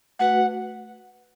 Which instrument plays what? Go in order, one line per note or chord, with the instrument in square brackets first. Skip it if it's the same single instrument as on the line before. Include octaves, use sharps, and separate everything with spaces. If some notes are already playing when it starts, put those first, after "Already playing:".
[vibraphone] A3 F#4 B4 [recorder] F#5